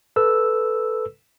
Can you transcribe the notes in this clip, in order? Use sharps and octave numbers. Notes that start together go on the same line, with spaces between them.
A4 B4 E6